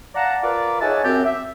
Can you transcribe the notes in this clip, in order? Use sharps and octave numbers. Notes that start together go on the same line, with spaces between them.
D5 F5 F#5 A5 A#5
F4 A#4 B4 D5
D#4 G#4 C#5 E5 F#5 A5
F#2 C4 G4
E5